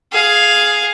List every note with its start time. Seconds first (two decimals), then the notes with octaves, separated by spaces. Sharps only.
0.12 G#4 F5